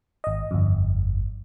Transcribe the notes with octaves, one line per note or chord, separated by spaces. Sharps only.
G#1 D#5
G1 F2